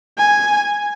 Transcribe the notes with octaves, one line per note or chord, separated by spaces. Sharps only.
G#5